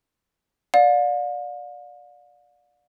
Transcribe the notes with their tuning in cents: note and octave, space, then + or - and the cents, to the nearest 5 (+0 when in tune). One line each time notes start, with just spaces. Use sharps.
D5 +0 F5 +40